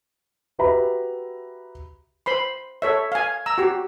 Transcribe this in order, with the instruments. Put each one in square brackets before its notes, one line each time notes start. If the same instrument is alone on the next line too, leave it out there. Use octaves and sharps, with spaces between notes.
[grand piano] F#4 G4 B4 E5 A#5 B5
[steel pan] C5 B5 C6
A4 C#5 E5
F5 G#5
A#5 E6
F#4 G4